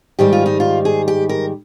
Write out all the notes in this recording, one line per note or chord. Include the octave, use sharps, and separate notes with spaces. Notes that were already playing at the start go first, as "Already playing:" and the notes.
G#2 D#3 G3 G4
F4
D#4
F4
G#4
G4
A#4